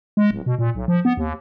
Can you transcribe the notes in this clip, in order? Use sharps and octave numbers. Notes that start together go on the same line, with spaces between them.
G#3
D1
B2
A#2
B1
F3
B3
D#2